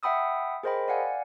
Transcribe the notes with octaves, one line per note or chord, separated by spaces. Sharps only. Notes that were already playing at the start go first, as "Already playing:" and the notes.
E5 F#5 G5 B5 D#6 E6
G#4 A#4 C5 D#5 G5 B5
D5 F5 F#5 G#5